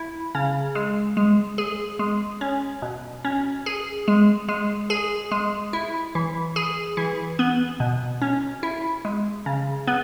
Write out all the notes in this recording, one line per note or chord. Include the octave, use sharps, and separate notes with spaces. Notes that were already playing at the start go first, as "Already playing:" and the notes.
Already playing: E4
C#3
G#3
G#3
G#4
G#3
C#4
B2
C#4
G#4
G#3
G#3
G#4
G#3
E4
E3
G#4
E3
B3
B2
C#4
E4
G#3
C#3
B3